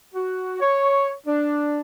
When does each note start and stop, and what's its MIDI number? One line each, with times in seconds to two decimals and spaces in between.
0.14 0.57 66
0.61 1.10 73
1.26 1.79 62